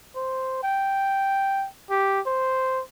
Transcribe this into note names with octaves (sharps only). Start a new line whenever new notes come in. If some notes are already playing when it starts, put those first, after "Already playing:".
C5
G5
G4
C5